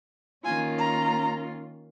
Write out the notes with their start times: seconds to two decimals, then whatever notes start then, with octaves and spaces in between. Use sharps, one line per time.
0.45 D#3 A#3 C#4 F4 G#5
0.78 A#5